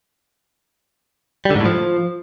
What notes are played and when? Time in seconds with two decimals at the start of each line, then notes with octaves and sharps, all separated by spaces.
1.45 G3
1.50 D3
1.55 G#2
1.60 A2
1.65 F3